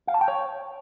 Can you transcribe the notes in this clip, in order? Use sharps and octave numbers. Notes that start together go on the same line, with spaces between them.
F5
A5
G5
C#5